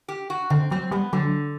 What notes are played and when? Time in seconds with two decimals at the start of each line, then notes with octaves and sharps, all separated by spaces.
0.08 G4
0.30 F#4
0.50 D3 C4
0.71 F#3 C4
0.91 G3 B3
1.13 D3 F#3